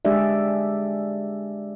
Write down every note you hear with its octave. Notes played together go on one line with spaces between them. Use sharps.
G#3 D4 G4 G#4 D5 E5